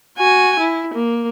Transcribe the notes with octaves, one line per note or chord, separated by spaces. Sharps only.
F#4 G#5
E4
A#3